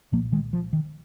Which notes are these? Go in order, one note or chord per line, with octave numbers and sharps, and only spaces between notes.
C2 A#2 F3 A#3
D#3 G#3
F3
D#3